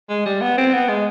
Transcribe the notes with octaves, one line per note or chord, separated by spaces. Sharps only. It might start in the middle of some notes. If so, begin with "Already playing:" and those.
G#3
G3
B3
C4
B3
G#3